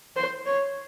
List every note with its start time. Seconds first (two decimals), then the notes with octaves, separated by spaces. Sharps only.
0.16 C5
0.46 C#5